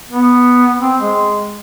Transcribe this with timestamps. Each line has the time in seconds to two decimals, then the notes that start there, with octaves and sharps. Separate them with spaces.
0.10 B3
0.80 C4
1.01 G#3